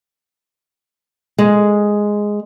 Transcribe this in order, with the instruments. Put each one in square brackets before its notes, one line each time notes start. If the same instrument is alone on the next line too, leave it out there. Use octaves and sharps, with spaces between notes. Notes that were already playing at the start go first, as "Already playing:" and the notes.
[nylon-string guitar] G#3